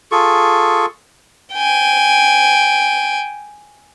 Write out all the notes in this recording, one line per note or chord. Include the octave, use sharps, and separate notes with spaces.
F4 G#4 A4 C#6
G5 G#5